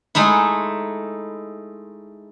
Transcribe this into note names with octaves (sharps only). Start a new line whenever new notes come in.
G#3 A3 D#4 E4